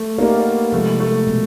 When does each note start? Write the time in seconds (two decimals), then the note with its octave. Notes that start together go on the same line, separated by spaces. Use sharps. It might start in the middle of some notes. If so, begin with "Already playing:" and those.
Already playing: A3
0.18 A#3 B3 D#4 G4 A#4 D5
0.73 C3 F3 G#3 A3
1.00 A3
1.27 B2 G#3